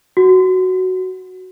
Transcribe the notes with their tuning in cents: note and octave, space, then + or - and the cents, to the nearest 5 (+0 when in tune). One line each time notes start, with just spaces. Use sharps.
F#4 +5